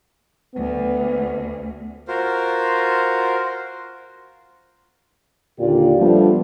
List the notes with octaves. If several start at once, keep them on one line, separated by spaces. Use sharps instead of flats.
D2 B3
F4 F#4 A#4 C5
D#2 A#2 D3 F4 G4 D5
F3 G3 A3 B3 D4 F4